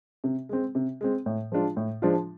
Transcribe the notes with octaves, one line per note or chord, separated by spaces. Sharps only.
C3
G#3 C4
C3
G#3 C4
A2
F3 G#3 D4 F4
A2
F3 G#3 D4 F4